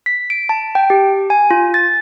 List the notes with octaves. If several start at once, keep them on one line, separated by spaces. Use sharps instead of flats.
B6
D7
A5
G5
G4
G#5
F4
A6